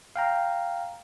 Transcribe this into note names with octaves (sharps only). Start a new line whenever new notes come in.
F5 G5 A#5